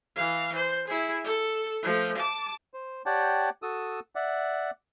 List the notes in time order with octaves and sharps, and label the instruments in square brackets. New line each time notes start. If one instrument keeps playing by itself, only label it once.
[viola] E3 F5
C5
E4 G#4
A4
F3 A3
A5 D6
[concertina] C5
G4 C#5 D5 F#5 G5 A5
F#4 A4 D#6 E6
D5 E5 F#5